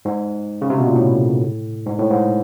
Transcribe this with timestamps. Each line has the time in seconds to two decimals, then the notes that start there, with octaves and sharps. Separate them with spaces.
0.05 G#2
0.62 C#3
0.70 C3
0.78 B2
0.87 A#2
0.96 A2
1.87 G#2
1.98 A2
2.10 G#2